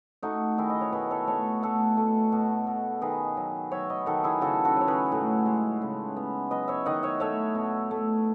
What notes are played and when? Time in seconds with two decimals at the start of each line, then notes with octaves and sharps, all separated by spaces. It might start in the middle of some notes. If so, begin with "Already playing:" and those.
0.23 A3 D#4 F#4
0.58 D#3 E4 G#4
0.70 D#5
0.81 C#5
0.92 B2 G#4 B4
1.11 A4 C#5
1.27 A3 A4 C#5
1.63 A3 F#4 A4
1.97 A3
2.32 B2
2.67 B2
3.02 D#3 G#4 B4
3.37 F#3
3.72 F#3 C#5 E5
3.90 B4 D#5
4.06 D#3 F#4 A4
4.24 E4 G#4
4.41 C#3 F#4 A4
4.65 F#4 A4
4.77 F#3 C#5
4.88 G#4 B4
5.12 A2
5.46 G#3
5.82 C#3
6.16 B3
6.51 F#3 B4 D#5
6.68 C#5 E5
6.86 D#3 D#5 F#5
7.03 C#5 E5
7.20 A3 C#5 E5
7.55 B2
7.91 A3